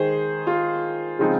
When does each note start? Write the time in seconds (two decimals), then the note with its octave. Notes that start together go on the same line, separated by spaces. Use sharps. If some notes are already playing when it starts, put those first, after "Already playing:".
Already playing: D#3 G#3 D#4 G#4 C5
0.47 F4
1.19 C#3 F3 G#3 C4 D#4